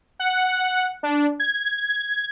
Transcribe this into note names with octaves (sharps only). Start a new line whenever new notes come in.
F#5
D4
G#6